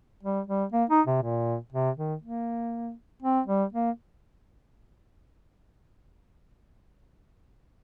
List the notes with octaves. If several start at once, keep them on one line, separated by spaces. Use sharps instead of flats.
G3
G3
A#3
D#4
C3
A#2
C3
D#3
A#3
C4
G3
A#3